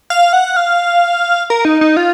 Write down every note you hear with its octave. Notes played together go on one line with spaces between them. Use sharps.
F5
F#5
F5
A#4
D#4
D#4
F4